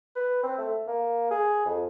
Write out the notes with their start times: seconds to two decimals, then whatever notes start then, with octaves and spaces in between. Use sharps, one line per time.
0.16 B4
0.44 C4
0.58 A3
0.88 A#3
1.31 G#4
1.66 F2